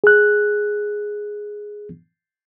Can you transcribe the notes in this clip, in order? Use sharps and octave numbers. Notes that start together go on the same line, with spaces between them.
G#4 F#6